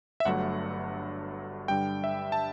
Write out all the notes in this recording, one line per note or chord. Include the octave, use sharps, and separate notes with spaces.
E5
G1 G2 F#3 A3 F#5
G2 D3 G3 G5
E5
A5